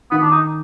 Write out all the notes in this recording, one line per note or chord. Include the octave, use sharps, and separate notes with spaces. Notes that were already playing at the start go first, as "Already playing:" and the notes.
D#3 B3
D4
D#4